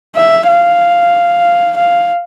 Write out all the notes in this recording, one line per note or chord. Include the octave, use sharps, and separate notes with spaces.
E5
F5
F5